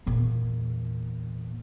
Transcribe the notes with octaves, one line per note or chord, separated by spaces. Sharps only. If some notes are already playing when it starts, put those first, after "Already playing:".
E2 A#2